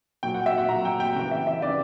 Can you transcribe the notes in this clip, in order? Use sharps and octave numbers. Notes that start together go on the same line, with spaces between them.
A#2 F#3 G5
F#5
E5
F#5
A#2 F#3 A#5
G5
G5
C#3 E3 G5
E5
E5
C#3 E3 D5